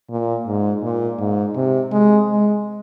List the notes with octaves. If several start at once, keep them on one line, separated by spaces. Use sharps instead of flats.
A#2
G#2
A#2
G#2
C3
G#3
G#3